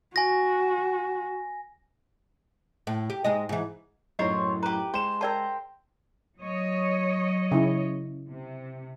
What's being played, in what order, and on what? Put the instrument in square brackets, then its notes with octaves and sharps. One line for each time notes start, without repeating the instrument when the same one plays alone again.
[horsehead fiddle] F#4 [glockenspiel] G#5 A#6
[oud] A2
G4
G#2 G#3 D#5
G#2 E3
[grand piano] F#2 A2 [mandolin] C4 C5 C#5 [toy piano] E4 D#5
[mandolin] G4 B4 [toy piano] A#5
[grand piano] G#3 E7 [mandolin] C5 [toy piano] G5
[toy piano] A#4 D5 A5 [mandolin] C5 G5 A#5
[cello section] F#3 C#5 D#5
[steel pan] C#3 E4
[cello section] C3